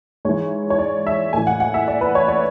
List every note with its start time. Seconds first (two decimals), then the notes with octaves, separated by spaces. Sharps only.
0.25 G#2 E3 C#5
0.70 C#5
0.79 D5
1.07 E5
1.33 A2 E3 G#5
1.47 F#5
1.60 F#5
1.74 E5
1.88 D5
2.01 B4
2.15 C#5
2.28 D5